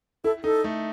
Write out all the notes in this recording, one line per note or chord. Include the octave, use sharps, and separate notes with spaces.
E4 A4
D#4 A4
A3